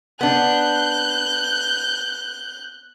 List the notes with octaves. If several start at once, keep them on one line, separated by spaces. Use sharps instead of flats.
B3 D4 F#6 G6